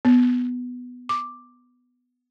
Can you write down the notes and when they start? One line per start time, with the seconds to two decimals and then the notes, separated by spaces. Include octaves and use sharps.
0.05 B3
1.09 D6